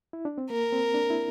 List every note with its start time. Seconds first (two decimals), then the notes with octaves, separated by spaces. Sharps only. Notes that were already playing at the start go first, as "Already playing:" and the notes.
0.13 E4
0.25 D4
0.38 C4
0.50 A#3 A#4
0.72 C4
0.94 D4
1.10 E4